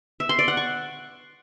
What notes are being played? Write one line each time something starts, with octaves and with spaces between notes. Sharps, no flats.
E5
C6
D5
F#5
C#6